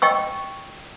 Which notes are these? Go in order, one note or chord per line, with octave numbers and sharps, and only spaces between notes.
D#5 G5 C#6 E6